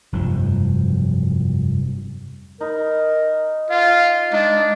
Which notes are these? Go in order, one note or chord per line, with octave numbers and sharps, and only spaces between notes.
F1 G2 F3
D#4 A#4 B5
F4 F5
G#3 D4 D#4